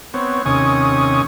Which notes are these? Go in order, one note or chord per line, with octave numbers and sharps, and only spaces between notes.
B3 C4 C#5
D#2 C3 C#4 G#5 C#6 D#6